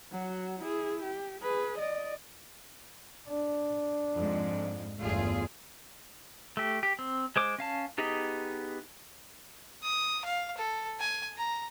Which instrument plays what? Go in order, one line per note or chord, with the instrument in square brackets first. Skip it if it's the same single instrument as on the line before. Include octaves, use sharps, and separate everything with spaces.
[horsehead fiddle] F#3 F#4
E4 G#4
G4
G#4 B4
D5 D#5
[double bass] D4
[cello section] F2 G#2
[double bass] G1 E2 [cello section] A3 F4 G#4
[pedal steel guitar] A3 G4
G4
C4
G#3 C5 D6
C#4 F5 A5
B3 D#4 G4 G#4 D#5
[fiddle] D#6
F5
A4
G#5
A#5